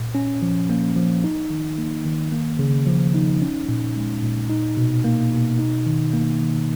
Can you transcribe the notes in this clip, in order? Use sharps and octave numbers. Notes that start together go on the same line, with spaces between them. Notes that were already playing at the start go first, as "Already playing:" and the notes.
Already playing: A#2
C#4
F3
A#3
F3
D#4
D#3
A#3
D#3
A#3
C#3
F3
D#4
C#4
A#2
G#3
A#2
D#4
B2
A#3
B2
D#4
D#3
A#3
D#3